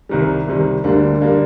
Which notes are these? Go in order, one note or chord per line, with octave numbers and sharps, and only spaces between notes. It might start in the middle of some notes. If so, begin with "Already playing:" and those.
C2 C3 D#3 G3
C2 C3 D#3 G3
D2 D3 G3 A#3 D4
D3 G3 A#3 D4